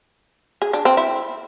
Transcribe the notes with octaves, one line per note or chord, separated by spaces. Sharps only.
G#4
D4
C4
E4